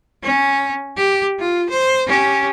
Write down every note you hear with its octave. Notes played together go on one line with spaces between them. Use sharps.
C#4
G4
F4
C5
C#4 G4